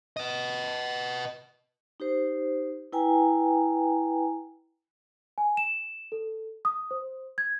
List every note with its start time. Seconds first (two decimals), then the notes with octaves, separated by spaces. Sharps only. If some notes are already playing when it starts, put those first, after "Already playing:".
0.17 B4 D#5
2.00 D#4 G4 C5
2.93 E4 B4 G5 G#5 A#5
5.38 G#5
5.57 E7
6.12 A4
6.65 D#6
6.91 C5
7.38 G#6